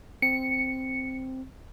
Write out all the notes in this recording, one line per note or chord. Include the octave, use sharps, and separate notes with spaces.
C4 C#7